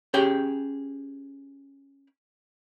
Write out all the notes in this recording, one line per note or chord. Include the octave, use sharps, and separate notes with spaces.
C#4 G4 G#4 G5